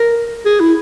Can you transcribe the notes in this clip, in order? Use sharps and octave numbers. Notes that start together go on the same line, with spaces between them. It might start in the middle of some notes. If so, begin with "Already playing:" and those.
Already playing: A#4
G#4
E4